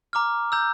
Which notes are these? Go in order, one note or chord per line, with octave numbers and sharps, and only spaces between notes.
A#5 D6 F6
A#5 E6 G6